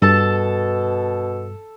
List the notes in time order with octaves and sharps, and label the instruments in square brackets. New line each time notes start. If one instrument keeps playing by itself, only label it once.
[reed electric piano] G2 [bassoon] B2 [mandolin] A4 A5